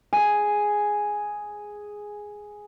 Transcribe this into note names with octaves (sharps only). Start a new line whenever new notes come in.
G#4 G#5